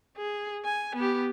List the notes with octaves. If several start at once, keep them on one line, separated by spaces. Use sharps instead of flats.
G#4
G#5
B3 G4